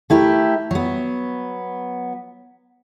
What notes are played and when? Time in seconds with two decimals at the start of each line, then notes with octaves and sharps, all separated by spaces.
0.10 A3 E4 G4 A#4
0.71 F#3 B3